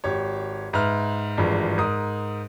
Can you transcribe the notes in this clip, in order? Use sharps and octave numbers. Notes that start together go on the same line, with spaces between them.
G#1 G4 C#5
G#2 B4 E5 F6
G#1 G2 E3 F3 G#3
G#2 A#4 D#6